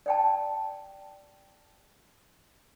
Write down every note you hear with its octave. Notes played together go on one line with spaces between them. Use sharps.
D5 G5 A5